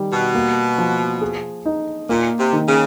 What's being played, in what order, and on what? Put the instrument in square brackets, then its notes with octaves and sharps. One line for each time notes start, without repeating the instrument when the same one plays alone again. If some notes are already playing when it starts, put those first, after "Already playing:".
Already playing: [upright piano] D#3 G3
[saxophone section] B2
[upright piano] A#3
F3
G#4
D#4
[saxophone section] A#2 [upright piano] A#3
[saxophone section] C3
[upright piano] D#3
[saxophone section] C#3